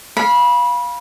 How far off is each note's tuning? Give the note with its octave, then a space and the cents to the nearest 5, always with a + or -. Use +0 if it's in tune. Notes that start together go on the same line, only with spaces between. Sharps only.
F5 +0 B5 -25